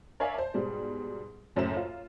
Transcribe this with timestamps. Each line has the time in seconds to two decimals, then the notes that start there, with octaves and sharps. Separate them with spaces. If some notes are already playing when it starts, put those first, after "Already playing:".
0.20 A#4 C#5 D5 E5 F5 G#5
0.34 C5 A5
0.54 G#2 B2 G3
1.56 F#1 F#2 A2 C5 E5 E7
1.77 F4